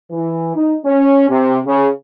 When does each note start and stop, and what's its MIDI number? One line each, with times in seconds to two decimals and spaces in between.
0.12 0.53 52
0.56 0.75 63
0.85 1.29 61
1.30 1.59 48
1.66 1.88 49